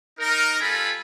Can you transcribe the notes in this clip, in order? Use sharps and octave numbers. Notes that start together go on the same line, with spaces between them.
D#4 A#4
G3 F4 A4 G#5 B5